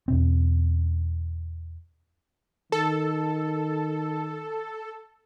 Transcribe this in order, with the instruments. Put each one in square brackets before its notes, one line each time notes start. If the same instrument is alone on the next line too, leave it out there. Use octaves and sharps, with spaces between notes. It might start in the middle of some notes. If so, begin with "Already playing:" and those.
[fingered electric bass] E2 B2 C4
[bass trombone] D#3 [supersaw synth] A4